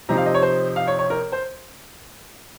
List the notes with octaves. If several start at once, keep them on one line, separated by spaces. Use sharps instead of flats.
C3 F3 C4 D#4 A#5
F5
D#5
C#5
C5
F5
C#5
C#5
A#4
C5